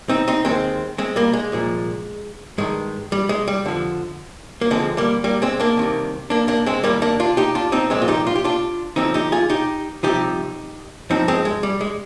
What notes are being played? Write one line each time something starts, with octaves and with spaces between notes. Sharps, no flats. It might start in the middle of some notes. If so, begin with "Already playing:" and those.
C4 D#4
C4 D#4
D#2 D#3 G#3 C4
G#3 C4
G3 A#3
G#3
C2 A#2 F3
G2 D#3 G#3
G3
G#3
G3
F2 D3 F3
A#3
D2 D3 F3 G#3 C4
G3 A#3
G3 A#3
G#3 C4
A#3 D4
C2 C3 D#3
A#3 D4
A#3 D4
G#3 C4
D#2 D#3 G3 A#3
A#3 D4
D4 F4
D#4 G4
D4 F4
C4 D#4
C2 A#2 F3 G#3 C4
F4
D#4 G4
F4
G4
D4 F4
D2 D3 F3 C4 D#4
D#4 G4
F4 G#4
D#4 G4
C2 C3 F3 D#4 G4
G2 F3 C4 D#4
G#3 C4
G#3
G3
G#3